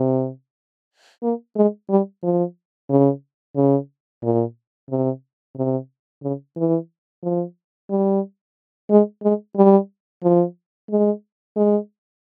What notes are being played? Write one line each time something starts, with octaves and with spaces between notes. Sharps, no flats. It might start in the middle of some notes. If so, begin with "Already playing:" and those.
Already playing: C3
A#3
G#3
G3
F3
C#3
C#3
A#2
C3
C3
C#3
E3
F3
G3
G#3
G#3
G3
F3
G#3
G#3